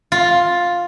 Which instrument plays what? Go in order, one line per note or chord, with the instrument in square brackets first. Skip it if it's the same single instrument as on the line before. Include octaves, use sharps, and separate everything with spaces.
[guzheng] F4